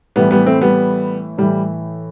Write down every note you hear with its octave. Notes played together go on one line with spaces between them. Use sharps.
A2 E3 G3 B3
G3 B3
A3 C4
G3 B3
A2 E3 G3